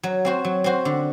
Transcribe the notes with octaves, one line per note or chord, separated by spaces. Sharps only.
F#3
C4 F#4 C5
F#3
C4 F#4 C5
D3